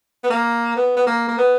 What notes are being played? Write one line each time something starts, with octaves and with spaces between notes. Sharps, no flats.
B3
A#3
B3
B3
A#3
A#3
B3